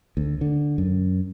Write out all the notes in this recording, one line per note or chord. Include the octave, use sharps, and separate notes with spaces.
D2
D3
F#2